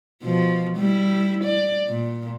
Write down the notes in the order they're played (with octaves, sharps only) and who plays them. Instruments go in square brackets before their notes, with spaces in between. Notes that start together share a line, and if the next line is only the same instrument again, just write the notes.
[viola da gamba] B2 F3
G3 E4
D5
A#2